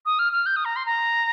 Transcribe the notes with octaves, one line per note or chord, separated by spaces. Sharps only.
D#6
F6
F6
G6
D#6
A#5
C6
A#5